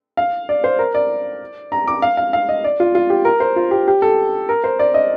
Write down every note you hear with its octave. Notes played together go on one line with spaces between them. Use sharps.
F5
D5
C5
A#4
D5
A#5
D6
F5
F5
F5
D#5
D5
F4
F4
G4
A#4
C5
F4
G4
G4
A4
A#4
C5
D5
D#5